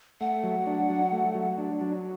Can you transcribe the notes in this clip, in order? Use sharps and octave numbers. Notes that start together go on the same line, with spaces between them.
A3 F#5
F#3
D4
F#3
A3
F#3
D4
F#3